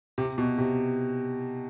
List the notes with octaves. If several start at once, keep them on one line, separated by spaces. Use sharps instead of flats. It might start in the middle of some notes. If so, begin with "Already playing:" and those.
C3
B2
C3